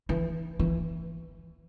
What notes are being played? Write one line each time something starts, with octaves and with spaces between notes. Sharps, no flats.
E3
E3